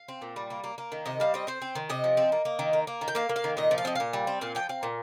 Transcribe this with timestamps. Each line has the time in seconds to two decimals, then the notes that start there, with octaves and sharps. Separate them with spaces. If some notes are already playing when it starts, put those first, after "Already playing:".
Already playing: F5
0.08 C4
0.22 A#2
0.36 G3
0.50 A#3
0.64 A#3
0.78 A#3
0.92 D#3
1.06 C3 D#5
1.20 G3 F5
1.34 C4 D#5
1.47 C4 C5
1.62 C4
1.75 D#3
1.89 C3 D#5
2.04 F3
2.17 C4
2.32 A#3
2.45 A#3
2.59 D#3
2.73 A#3
2.87 A#3
3.01 D#3
3.08 G5
3.15 A#3 F5
3.29 A#3
3.36 F5
3.44 D#3
3.57 A#2 D#5
3.71 F3
3.78 F5
3.85 C4 D#5
3.95 A#2 F5
4.13 G3
4.27 C4
4.41 A#2 F5
4.55 F3 G5
4.69 C4 F5
4.83 A#2